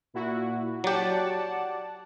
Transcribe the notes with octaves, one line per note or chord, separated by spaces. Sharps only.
A#2 E4 F#4
F#3 G4 D5 F#5 A5